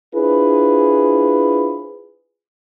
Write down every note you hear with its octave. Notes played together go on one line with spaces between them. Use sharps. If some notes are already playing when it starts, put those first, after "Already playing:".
D4 E4 F4 G#4 B4 C5